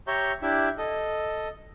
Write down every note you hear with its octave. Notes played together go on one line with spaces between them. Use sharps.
G4 C#5 E5 A#5 C#6 G6
D4 E4 G4 E5
A4 D#5